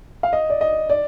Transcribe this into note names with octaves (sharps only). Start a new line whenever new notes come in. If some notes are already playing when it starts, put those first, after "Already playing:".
F5
D#5
D5
D#5
D5